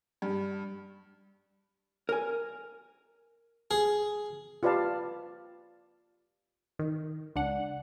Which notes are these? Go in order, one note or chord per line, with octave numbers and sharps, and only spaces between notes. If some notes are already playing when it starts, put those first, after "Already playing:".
G2
A#4 G#5
G#4
F4 G4 B4 D5 F5 A5
D#3
C#2 D4 F#5